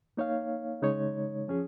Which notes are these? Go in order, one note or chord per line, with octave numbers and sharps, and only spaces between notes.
A#3 D#4 C#5 F5
C#3 G#3 D#4 C#5
F3 C#4 G#4